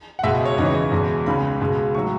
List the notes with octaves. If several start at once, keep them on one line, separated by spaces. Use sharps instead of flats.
F#5
C#2 B2 G#3 E5
D#5
C#5
E2 C#3 E3 D#5
C#5
D#5
E2 B2 G#3
C#2 C#3 G#3 B5
C#2 B2 G#3
A2 F#3 C#6